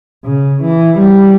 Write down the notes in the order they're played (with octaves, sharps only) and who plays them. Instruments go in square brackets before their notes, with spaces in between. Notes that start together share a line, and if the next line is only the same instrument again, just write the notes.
[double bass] C#3
E3
G3